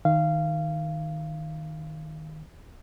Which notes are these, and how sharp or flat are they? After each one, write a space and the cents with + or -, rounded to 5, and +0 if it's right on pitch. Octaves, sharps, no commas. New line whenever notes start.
D#3 +0 F5 -20